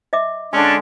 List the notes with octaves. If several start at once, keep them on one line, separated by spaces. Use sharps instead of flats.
D#5 E5 D6
D3 G#3 C#4 D4 G#5